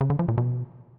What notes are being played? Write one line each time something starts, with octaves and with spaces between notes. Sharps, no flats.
C#3
D3
F3
A#2
B2